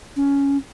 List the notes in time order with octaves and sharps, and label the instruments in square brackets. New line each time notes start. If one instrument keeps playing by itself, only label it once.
[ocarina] C#4